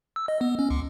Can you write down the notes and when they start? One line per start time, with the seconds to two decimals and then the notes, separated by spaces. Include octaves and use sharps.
0.16 E6
0.28 D#5
0.41 B3
0.59 C#4
0.70 C#2